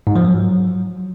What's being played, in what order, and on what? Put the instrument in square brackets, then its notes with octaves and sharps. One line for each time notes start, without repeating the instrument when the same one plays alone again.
[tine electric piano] G#2
F3
F#3